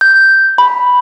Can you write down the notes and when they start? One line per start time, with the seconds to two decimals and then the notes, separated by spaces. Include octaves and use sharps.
0.01 G6
0.58 B5